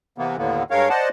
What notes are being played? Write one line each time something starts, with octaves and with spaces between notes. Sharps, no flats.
C3 E3 A#3 B3
D#2 A2 D3 A#3 B3
G2 G#3 A#4 C#5 F5
C5 D5 D#5 F#5 A5